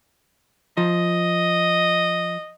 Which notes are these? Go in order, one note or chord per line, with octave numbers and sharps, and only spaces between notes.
F3 D#5